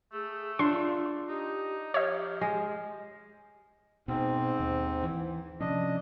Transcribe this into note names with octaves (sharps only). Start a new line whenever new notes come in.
A3 G#4
D4 F4 C6
D#4 G4
F3 G4 C#5 D#5
G#3
G#2 B2 C4
D#2
E3
C3 F3 C#4 D4 D#5